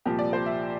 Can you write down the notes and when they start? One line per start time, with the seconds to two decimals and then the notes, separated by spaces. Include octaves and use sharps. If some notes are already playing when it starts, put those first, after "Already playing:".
0.05 C2 A#2 F3 G4
0.19 D5
0.33 C5
0.46 E5